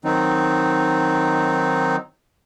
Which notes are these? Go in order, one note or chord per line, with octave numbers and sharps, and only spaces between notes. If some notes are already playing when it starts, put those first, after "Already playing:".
D#3 F#3 C4 D#4